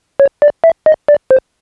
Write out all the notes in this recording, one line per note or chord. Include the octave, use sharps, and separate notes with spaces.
C#5
D5
E5
D#5
D5
C5